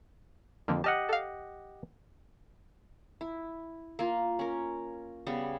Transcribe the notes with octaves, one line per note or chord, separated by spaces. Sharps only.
F2 D3 F3 A#3
G4 D#5 F#5 A5 F6
A4 F5
E4
A#3 F4
C#4 A#4
C#3 G3 B3